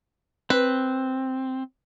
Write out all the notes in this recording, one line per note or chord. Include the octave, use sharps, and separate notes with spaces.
C4 B4